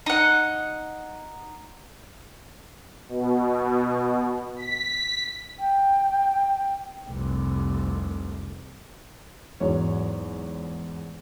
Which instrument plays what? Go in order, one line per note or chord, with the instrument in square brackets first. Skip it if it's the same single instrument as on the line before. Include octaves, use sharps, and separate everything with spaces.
[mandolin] D#4 F#5
[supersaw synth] B2
B6
[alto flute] G5
[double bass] F1 C2
[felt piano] E2 G#2 F#3 C#5